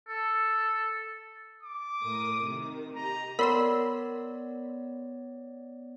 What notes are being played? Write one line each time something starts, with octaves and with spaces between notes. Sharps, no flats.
A4
D6
A2 A#4 D#6
C3 D#3
G4 D#5 A#5
B3 A#4 C#5 D5 B5 C6 E6